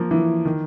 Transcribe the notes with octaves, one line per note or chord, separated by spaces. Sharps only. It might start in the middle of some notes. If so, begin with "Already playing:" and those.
Already playing: F3 A#3
E3
D#3